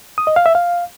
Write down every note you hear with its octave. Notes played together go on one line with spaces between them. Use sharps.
D#6
D#5
F5
E5
F5